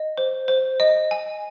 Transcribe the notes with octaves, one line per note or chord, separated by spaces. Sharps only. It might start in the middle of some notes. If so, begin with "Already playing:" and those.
Already playing: D#5
C5
C5
D#5
G#5